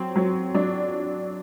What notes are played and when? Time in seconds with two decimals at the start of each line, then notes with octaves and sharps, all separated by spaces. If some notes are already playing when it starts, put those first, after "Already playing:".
Already playing: F#3 C4
0.16 F#3
0.54 F#3 D4